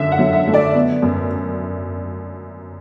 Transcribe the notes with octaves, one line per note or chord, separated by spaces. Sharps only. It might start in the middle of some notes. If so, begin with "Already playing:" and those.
Already playing: F#2 D3 E5
F#5
F#3
E5
A3
D5
B3
F#2